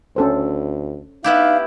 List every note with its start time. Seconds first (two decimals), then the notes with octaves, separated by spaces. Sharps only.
0.16 D2 C#4 A4 C5
1.24 B3 D#4 E4 G4 F5